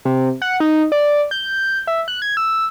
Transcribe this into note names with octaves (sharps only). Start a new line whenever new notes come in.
C3
F#5
D#4
D5
G6
E5
F#6
G#6
E6